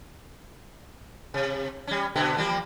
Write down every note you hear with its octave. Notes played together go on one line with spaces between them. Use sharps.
C3
G3 C#4
B2 D3 B3
F3 G3 A#3